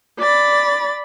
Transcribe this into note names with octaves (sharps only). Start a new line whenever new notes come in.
D5 B5 A6